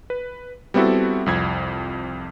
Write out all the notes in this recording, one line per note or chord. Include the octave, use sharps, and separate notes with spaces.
B4
G3 B3 C4 E4 F#4 A4
C2 F2 G#6